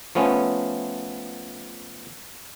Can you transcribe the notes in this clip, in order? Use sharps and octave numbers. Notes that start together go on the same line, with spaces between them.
F3 A3 B3 C#4